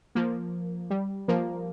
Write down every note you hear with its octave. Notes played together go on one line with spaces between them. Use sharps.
F3 A#3
G3
F3 A#3